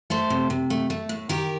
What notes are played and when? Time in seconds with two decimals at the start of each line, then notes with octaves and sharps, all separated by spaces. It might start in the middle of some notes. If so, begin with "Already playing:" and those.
0.10 A3 A4 C5
0.30 C3
0.50 C3
0.70 A3
0.90 A3
1.09 A2
1.29 D#3 G4 A#4